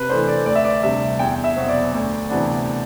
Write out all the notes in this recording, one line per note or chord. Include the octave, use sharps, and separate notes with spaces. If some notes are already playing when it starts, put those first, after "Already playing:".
Already playing: C3 B4
E3 A3 D4 C5
D5
D2 D5
E5
D5
C3 G3 D4 E5
E2 G5
E5
B2 F#3 C4
D5
D2
C3 E3 B3 D4